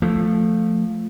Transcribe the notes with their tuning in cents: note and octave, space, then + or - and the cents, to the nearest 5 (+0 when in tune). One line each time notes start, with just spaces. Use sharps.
F3 +0 A3 +0